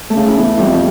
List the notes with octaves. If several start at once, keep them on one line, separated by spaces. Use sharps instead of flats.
A3
C#3
E4
E2
F2 G3